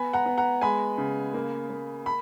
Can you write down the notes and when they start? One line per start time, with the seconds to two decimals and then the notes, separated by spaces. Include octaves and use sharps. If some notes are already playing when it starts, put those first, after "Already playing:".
Already playing: B3 G#5 B5
0.13 F#5 A#5
0.26 B3
0.38 F#5 A#5
0.61 G#3 G#5 B5
0.98 C#3
1.34 A#3
1.70 A#3
2.06 B5